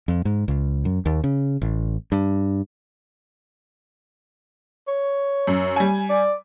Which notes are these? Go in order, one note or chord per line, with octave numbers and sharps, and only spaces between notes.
F2
G#2
C#2
F#2
D#2
C#3
A1
G2
C#5
F#2
G3 G#5
D5